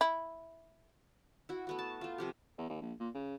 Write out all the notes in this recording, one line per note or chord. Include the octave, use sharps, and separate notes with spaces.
E4
E4 F#4
A3 B3 F#4
A5
A3 F4
C3 F3 G4
E2
D#2
A#1
A#2
C#3